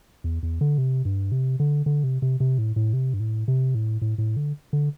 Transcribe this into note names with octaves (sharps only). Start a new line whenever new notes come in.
E2
E2
D3
C3
G2
C3
D3
D3
C3
C3
C3
A2
A2
C3
G2
A2
C3
A2
A2
A2
D3
D3